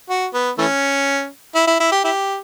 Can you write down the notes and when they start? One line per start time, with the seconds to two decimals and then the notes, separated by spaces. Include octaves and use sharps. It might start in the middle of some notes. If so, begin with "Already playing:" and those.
0.09 F#4
0.33 B3
0.58 E3 A3 C#4
1.55 E4
1.67 E4
1.80 E4
1.92 G4
2.04 E4 G4